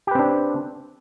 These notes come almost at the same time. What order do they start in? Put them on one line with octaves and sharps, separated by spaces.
G4 B4 C4 D4